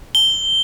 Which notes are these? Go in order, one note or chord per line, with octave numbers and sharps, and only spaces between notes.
G7